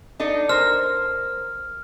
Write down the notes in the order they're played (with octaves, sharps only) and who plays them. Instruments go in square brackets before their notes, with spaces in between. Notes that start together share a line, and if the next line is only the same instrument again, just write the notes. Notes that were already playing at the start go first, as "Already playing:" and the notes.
[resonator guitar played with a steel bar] D4 D#4 A4
[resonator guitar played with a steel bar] A#4 C5 [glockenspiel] F6